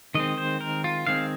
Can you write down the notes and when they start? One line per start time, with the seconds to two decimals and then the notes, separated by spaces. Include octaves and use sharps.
0.15 D#3 G#3 C4 D#5
0.38 C5
0.61 A#4
0.84 F4
1.07 D#3 G#3 C4 F5